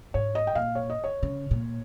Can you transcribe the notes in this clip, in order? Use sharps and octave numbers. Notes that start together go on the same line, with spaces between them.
G#2 C#5
D#5
G5
A#2 F5
C#5
D#5
C#5
C#3
A#2